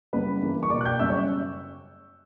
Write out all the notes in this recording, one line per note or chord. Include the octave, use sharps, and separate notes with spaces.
F#2 C#3 G3 B3 B4 B5
G2 E3 A#3
C#6
B2 A#3 D5 D6
F#6
G5 G6
F#2 C#3 G3 B3 E5 E6
C#5 C#6